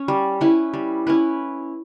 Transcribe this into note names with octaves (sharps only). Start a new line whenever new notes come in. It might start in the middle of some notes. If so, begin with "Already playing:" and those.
Already playing: C#4
G3
C#4 E4 B4
G3
C#4 E4 B4